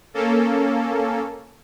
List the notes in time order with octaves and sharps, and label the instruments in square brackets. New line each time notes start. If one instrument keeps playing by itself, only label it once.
[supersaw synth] A#3 C#4 A4